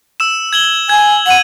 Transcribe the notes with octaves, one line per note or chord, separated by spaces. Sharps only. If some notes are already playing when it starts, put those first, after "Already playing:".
E6 E7
G#6 F#7 G7
G#5 G#6
F#5 D#7 F#7